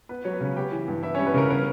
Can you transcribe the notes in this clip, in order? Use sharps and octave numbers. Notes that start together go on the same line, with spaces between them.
B3 B4
F#3 C#5
B3 B4
C#3
B3 G4 G5
E3
G2
B3 E4 E5
G3 C#4 C#5
B3 B4
C#3 A#4
B3 A#4